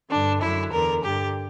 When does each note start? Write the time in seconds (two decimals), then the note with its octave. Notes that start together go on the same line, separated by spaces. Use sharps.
0.10 G2 D3 D4
0.41 F#2 D3 E4
0.72 E2 D3 A#4
1.03 G2 D3 G4